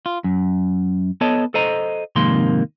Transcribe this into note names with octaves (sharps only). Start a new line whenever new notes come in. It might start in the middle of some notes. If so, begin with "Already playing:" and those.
F4
F#2
B3 A4 C#5 D#5 A5
A4 C5 D#5 A#5
F2 G#2 C3 D#3 A#3 C6